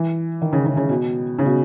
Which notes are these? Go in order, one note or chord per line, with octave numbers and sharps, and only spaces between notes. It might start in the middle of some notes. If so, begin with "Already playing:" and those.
Already playing: E3
D#3
C#3
C#3
C#3
B2
C#3
B2